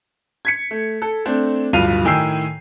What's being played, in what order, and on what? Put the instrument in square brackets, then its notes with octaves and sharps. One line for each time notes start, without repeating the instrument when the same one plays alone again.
[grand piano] G#6 B6 C#7
A3
A4
A3 C4 D4
D1 G2 F3 F5 D#7 F7
A2 D#3 G5 G#5 E6 C7